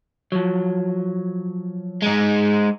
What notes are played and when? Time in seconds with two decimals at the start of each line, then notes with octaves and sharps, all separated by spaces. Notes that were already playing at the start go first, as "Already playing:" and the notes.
0.32 F3 F#3
2.02 G#3 D#4